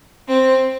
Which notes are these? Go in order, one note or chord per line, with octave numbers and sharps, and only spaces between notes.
C4